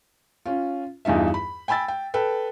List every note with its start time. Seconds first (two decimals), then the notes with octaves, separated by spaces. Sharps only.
0.46 C#4 F4
1.05 E2 G2 D#4 F4 E5
1.34 B5
1.68 G5 G#5 B5 E6 A6
1.88 G5
2.14 A4 B4 G5